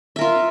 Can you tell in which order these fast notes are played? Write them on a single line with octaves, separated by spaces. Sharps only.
E5 A#4 F4